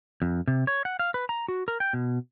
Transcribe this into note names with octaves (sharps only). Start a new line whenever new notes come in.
F2
C3
C#5
F#5
F5
B4
A#5
F#4
A#4
G5
B2